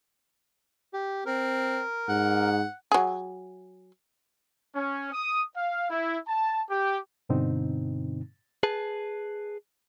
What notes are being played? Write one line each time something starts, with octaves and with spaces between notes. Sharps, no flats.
G4
C4 A#4
G#2 F#5
F#3 G#4
C#4
D#6
F5
E4
A5
G4
G2 B2 D3 C4 D#4
G#4 B4 A5